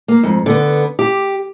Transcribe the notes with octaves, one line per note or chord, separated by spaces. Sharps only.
A#3
F2 G#2
D3 B3
G4